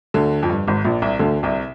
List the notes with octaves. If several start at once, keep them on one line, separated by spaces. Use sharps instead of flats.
D2 D3
F2
G2
G#1 G#2
A#1 A#2
C2 C3
D2 D3
C2 C3